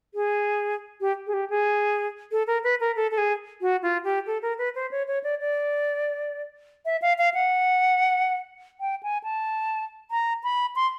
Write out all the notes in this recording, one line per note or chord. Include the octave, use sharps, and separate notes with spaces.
G#4
G4
G#4
G4
G#4
A4
A#4
B4
A#4
A4
A4
G#4
F#4
F4
G4
A4
A#4
B4
C5
C#5
C#5
D5
D5
E5
F5
F5
F#5
G5
G#5
A5
A#5
B5
C6